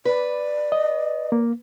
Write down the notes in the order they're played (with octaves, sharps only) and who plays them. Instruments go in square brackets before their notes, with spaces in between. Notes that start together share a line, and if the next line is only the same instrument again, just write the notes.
[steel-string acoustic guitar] B4 [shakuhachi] D5
[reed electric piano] D#5
A#3